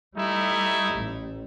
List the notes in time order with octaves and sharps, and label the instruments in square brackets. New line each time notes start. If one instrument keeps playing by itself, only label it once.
[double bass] G3 [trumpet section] A3 D#4 E4
[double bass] A1